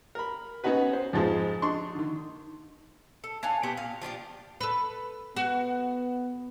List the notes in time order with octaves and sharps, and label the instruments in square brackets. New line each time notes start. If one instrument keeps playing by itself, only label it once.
[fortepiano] A#4 B5
B3 C#4 D#4 F#4 B4
C5
F2 G#2 F3 G#3
D4 D#4 C6 C#6
D3 D#3
[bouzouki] A4
D4 C#5 F5 G#5
B3 C4 F#4 G4
A#2 F5
F3 D4 F4 G4
[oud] A4 B4
[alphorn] B3 [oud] F#4